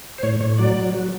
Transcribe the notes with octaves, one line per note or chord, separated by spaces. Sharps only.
C5
A2 C#5
A2 C#5
F#3 D5
F#3
F#3